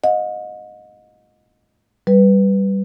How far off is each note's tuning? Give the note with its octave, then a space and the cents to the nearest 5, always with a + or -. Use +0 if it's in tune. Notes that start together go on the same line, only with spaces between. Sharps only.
D#5 +0 F#5 -45
G3 -10 B4 +0